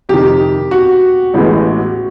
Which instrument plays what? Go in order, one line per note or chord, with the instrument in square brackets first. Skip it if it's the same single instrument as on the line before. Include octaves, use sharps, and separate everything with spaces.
[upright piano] F2 C3 D#3 [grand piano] G4
[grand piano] F#4
[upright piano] A1 A2 E3 G#3 B3